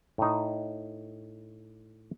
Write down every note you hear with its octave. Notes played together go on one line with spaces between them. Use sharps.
A2 D#4